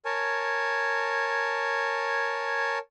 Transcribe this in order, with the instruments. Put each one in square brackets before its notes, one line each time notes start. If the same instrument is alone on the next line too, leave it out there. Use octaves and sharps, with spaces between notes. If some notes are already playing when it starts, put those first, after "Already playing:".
[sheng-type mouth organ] A#4 C#5 G#5 A5